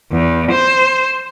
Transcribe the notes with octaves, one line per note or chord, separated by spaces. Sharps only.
E2
C5